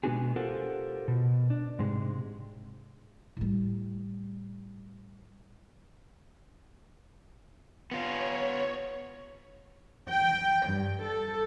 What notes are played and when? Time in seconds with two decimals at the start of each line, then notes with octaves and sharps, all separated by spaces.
0.04 B2 G#3 B3 D4 F#4 G#4
0.36 F4 G4 A4 A#4 C5 F#5
1.08 B2
1.50 D4
1.79 G#2 C3 G#3
3.37 A2 G3
7.91 B3 F4 C#5
10.10 G5
10.68 G2
11.02 A4